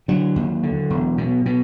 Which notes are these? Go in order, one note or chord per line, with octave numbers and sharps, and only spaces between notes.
D3 F#3
D#2
D3
E1
B2
B2